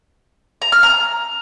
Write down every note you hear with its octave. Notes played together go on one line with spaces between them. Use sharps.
A#5
F6
A#5